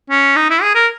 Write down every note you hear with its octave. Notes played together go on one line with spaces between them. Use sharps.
C#4
D#4
E4
G#4
A#4